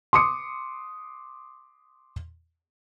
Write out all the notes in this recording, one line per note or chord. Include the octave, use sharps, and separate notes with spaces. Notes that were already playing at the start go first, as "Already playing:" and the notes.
C6 D6 D#6 C#7